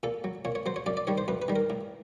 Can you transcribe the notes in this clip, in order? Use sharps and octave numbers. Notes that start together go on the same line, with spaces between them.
A#2 A4
F#3
A#2 C#5
C#5
F#3 C5
C#5
F#2 D5
D5
D#3 G3 C#5
C5
F#2 B4
B4
D#3 G3
A#4
A2